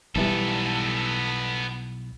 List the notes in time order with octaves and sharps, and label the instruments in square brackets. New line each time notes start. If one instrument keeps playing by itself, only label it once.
[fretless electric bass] B1 E3 G3 [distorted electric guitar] B3 A4